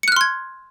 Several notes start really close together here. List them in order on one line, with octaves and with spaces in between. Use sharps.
C#7 F#6 F6 C6 G#6